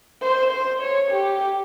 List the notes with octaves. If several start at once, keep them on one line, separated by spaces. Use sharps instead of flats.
C5
C5
C#5
G4